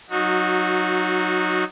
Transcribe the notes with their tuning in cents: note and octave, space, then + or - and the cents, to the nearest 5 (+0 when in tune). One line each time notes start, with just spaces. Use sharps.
F#3 +0 D#4 -10 F#4 -25